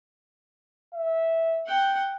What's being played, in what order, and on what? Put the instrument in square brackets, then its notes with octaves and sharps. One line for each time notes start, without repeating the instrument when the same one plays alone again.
[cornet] E5
[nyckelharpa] F#5 G5